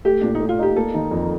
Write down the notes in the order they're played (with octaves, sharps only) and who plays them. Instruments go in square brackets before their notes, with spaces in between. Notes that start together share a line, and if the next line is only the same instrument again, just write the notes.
[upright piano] A3 [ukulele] G4
[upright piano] A#2 [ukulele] D4
[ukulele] D#4
[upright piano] A3
[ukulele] F4
[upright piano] D#4 [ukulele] G4
[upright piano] A#3 [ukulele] A4
[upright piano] D#3
F2